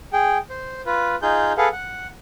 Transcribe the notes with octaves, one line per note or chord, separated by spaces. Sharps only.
G#4 G5
C5
F4 B4
D#4 F4 G#4 G6
G#4 A4 B4 F5 F#5
F#5